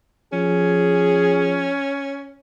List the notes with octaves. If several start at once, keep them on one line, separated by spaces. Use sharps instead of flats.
F3 C#4 G#4